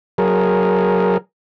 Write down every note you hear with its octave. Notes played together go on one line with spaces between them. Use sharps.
F#3 G#4 A#4